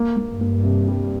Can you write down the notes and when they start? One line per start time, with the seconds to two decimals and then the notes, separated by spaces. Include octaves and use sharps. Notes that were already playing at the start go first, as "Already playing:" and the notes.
Already playing: A#3
0.17 A#3
0.29 G2
0.41 A#3
0.64 C3
0.88 G3